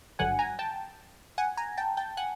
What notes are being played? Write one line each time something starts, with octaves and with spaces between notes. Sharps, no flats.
G#1 G2 D3 F#3 F#5 G#5
G#5 A#5
G5 A5
F#5 G#5
G#5 A#5
G5 A5
G5 A5
F#5 G#5